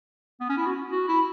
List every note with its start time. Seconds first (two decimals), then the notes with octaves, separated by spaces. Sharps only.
0.41 B3
0.49 C#4
0.57 E4
0.66 F#4
0.91 F#4
1.08 E4